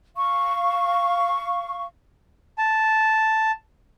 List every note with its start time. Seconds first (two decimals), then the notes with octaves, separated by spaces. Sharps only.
0.16 F5 C#6
2.58 A5